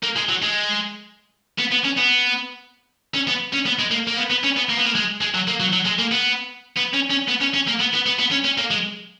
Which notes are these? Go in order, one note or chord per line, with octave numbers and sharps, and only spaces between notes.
A#3
G#3
F#3
G#3
B3
B3
C#4
B3
C#4
B3
C#4
B3
G#3
A#3
A#3
B3
B3
C#4
B3
A#3
B3
A#3
G#3
G#3
F#3
A#3
F#3
F#3
G#3
A#3
B3
B3
C#4
C#4
B3
C#4
C#4
A#3
B3
B3
B3
B3
C#4
C#4
A#3
G#3